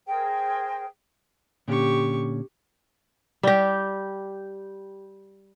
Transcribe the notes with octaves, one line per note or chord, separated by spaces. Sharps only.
G#4 A#4 C5 G5
A#2 D3 C#4 G4 C#6
G3 G4